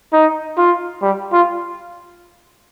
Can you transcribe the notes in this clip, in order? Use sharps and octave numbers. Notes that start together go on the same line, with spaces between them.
D#4
F4
G3
F4